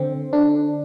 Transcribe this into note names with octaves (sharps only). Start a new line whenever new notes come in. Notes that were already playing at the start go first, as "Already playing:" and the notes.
Already playing: D3 C4
D3 D4